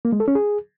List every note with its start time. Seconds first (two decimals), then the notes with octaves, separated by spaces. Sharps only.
0.05 A#3
0.12 G#3
0.20 A4
0.28 C#4
0.35 G#4